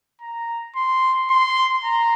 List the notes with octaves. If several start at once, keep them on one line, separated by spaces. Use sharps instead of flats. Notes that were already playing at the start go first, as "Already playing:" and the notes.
A#5
C6
C6
A#5